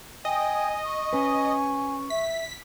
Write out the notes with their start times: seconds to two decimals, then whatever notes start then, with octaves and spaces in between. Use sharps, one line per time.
0.25 D#5 G5 G#5
0.85 C#6
1.13 C#4 B4 G#5
2.10 E5 B6